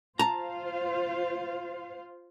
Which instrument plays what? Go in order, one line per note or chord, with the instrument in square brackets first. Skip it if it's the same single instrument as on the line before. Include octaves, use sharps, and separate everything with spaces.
[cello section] F4 C5 F5 [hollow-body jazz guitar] A5 A#5